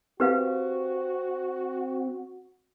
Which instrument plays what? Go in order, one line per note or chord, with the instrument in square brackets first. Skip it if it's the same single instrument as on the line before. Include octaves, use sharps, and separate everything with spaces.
[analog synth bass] C4 [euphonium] F#4 [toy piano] G4 B4 F5